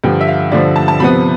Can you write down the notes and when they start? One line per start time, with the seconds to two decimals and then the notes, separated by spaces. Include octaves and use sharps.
0.04 G2 D3 F3 G5
0.21 E5
0.28 F5
0.52 G2 D3 F3 D5
0.76 A5
0.88 A5
1.00 C3 F3 B3 B5